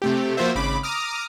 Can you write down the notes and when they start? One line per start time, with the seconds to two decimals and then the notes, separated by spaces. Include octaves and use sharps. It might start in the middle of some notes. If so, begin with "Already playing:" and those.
0.02 C3 A3 G4
0.37 F3 A#3 F4 F#4 C5 E5
0.55 G#1 C#3 B5 D6
0.83 A#5 D6 D#6 F6